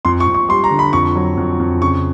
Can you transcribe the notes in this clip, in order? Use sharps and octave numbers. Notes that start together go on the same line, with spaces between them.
F2 C6
C#6
F2
C#6
G3 C6
A#5
D3
B5
F2 C#6
F#3
F2
F2
C#3 C#6